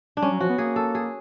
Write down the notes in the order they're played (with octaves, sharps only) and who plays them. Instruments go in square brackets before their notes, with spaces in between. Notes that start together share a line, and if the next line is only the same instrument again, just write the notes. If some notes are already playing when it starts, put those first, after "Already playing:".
[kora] D4
[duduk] G3 [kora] C#4
[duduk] F#3
[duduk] F3 [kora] F#4
[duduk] B3
[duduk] A#3 [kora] G#4
[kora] A4
G#4